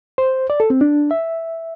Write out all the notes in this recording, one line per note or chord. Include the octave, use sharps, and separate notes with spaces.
C5
D5
A4
C4
D4
E5